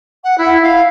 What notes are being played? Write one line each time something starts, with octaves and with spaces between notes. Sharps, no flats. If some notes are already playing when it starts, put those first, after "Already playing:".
F#5
E4
F5